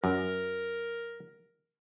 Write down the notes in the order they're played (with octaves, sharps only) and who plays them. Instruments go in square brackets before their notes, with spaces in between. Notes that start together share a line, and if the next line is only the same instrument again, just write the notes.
[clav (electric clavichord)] F#2 [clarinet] A#4